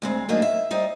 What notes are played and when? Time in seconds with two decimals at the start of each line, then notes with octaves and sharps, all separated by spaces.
0.02 D2 G#3 C4
0.29 F#3 A3 A#3 D4 D#4 G#4
0.42 E5
0.71 G3 D#4 C5